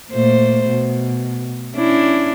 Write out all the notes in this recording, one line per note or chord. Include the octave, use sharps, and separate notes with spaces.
A#2 A3 C5
B2
C#4 D4 E4